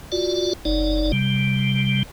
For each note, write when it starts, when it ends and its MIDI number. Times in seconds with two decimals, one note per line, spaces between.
0.12 0.53 65
0.12 0.53 66
0.12 0.53 74
0.65 1.12 30
0.65 1.12 63
0.65 1.12 74
1.12 2.03 48
1.12 2.03 55